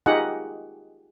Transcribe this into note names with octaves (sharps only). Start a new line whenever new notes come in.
D#4 F4 G4 G#4 D#5 F#5